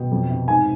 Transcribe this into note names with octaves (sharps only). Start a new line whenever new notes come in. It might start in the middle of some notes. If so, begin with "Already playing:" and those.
Already playing: B2 G5
F2
C3
G#2 G#5